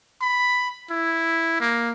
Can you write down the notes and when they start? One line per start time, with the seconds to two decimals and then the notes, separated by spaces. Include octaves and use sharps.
0.22 B5
0.91 E4
1.60 A#3